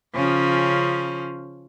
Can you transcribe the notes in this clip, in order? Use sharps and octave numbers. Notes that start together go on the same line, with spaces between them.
C#3 F3 C#4